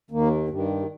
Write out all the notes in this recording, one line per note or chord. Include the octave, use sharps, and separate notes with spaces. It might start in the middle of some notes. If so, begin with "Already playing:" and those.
D#2 D#3 A#3
G2 D#3 G3